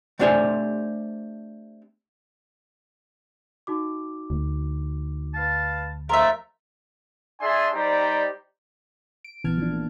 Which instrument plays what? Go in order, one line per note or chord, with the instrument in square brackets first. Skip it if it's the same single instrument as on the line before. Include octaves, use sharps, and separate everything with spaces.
[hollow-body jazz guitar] A3 C4 D4 G4 C5 G#5
[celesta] D#4 F#4 D6
[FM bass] D2
[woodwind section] B4 F5 A5
[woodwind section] D#2 F3 A3 [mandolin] A#4 E5 [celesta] F5 C6
[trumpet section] D4 G#4 E5 G#5 A5 C6
G3 D#4 G4 C5 D5 A#5
[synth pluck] D7
A#1 E3 B3 A5 F6 G#6
F3 D4
A#3